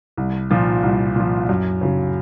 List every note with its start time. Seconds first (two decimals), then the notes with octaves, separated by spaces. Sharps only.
0.17 C2
0.51 A#2 F3
0.83 C2
1.16 A#2 F3
1.49 F#2
1.81 C#3 F#3